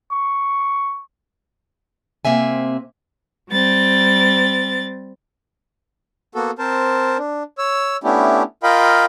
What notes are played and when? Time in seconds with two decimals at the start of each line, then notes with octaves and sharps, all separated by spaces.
0.11 C#6
2.25 C3 A#3 C4 E5 G#5
3.50 G3 C4 A6
6.35 A#3 B3 F#4 A4
6.59 C4 A#4 C5 A5
7.19 D4
7.58 C#5 E6
8.04 A3 B3 C#4 D4 E4 G4
8.63 F4 A#4 D#5 F5 G5 B5